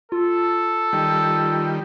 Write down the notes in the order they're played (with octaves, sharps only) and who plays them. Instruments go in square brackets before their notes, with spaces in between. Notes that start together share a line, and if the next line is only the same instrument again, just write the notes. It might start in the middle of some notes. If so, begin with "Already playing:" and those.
[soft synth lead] F4 [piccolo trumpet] A4
[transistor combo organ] D#3 G3